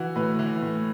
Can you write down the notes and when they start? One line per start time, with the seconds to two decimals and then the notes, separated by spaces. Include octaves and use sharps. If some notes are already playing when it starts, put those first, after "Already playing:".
Already playing: E3 E4 F#4
0.16 A2 B4
0.39 E3
0.62 A2